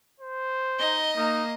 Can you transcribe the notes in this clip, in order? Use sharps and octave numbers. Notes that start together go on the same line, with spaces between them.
C5
D#4 D#5 G7
A#3 D#4 D#6